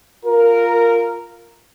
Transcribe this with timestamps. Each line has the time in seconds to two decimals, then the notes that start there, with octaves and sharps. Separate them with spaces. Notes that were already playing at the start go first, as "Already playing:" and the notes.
0.24 F4 A#4